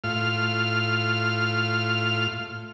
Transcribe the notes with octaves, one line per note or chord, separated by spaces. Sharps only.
A2 F4 F6